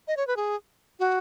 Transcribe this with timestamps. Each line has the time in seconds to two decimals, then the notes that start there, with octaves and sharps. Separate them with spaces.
0.08 D#5
0.17 C#5
0.27 B4
0.37 G#4
0.99 F#4